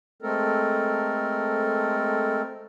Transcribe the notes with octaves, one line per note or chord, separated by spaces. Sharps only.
G#3 A3 C4 A4 A#4